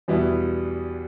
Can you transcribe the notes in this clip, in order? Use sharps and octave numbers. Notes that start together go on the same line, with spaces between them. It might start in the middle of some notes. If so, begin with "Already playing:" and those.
E2 B2 G3 B3 E4